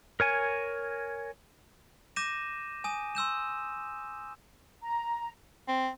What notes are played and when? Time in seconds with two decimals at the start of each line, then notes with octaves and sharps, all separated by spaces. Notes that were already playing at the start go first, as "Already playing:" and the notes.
0.20 A#4 C#5 G#5
2.16 D6 G6 A#6 D#7 E7
2.84 G#5 D#6 D#7
3.15 C6 E6 G6 E7
4.82 A#5
5.68 C4